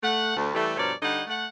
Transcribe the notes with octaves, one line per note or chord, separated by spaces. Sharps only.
A3 F#5
D2
E3 G3 A3
G2 B2 F3 A#4 C#5 D5
D3 G3 D#4 C#5 D#5 F#5
A3 F#5